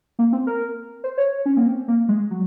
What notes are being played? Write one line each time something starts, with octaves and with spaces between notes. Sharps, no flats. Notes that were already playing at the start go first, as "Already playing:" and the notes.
A#3
C4
A#4
C5
C#5
C#4
A#3
C4
A#3
G#3
F#3